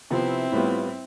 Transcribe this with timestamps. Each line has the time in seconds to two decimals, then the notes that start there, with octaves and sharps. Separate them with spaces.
0.10 C3 F3 B3 C4 E4
0.52 A2 G3 B3 F4